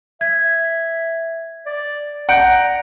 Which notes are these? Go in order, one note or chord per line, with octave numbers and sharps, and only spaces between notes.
E5 G#6
D5
D5 F#5 A#5 G6 D7